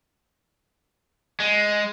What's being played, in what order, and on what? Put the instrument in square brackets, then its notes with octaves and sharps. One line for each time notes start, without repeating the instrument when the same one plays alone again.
[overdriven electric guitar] G#3